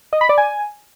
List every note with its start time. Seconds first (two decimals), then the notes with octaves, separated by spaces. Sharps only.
0.13 D#5
0.21 B5
0.29 D5
0.38 G#5